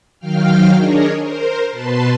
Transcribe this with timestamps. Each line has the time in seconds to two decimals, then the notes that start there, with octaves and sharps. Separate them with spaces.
0.19 D#3 F#3 F5 G5 F6
0.77 D4 G#4 A#4 C#5 D#5
1.20 A#4 C5
1.69 B2 B4 A5 C6